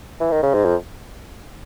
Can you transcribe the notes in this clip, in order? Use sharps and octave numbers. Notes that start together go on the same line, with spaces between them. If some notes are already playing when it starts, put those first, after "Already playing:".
E3
D#3
C#3
G#2
F2